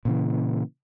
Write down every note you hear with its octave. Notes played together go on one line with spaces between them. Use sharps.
A#2 C#3 E3